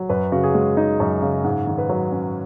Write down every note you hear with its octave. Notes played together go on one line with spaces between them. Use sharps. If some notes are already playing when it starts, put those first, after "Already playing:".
Already playing: F#3
F#2 B4
C#3 F#4
G#4
G#3
D#4
F#2
C#3
G#2
D#3
B4
F#3
C#4